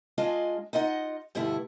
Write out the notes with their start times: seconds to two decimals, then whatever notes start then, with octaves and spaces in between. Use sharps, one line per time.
0.18 G#3 D4 F4 G#4 D#5
0.73 D#4 F4 D#5 F#5
1.35 G2 B2 D3 A3 E4